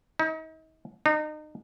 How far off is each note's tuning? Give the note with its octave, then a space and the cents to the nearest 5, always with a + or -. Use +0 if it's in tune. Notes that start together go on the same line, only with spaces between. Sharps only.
D#4 +40
D#4 -30